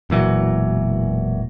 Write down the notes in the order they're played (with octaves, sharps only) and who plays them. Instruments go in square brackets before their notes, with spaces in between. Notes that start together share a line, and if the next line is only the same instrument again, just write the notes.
[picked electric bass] E1 A#2 E3 F#3